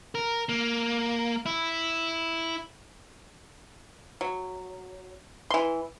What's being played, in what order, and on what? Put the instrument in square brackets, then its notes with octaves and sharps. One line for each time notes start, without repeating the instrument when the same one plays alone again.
[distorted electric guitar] A#4
A#3
E4
[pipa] F#3
E3 C6